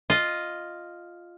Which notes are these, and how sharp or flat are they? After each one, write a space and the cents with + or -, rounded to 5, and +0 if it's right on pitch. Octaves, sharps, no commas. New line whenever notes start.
F4 +0 D#5 -5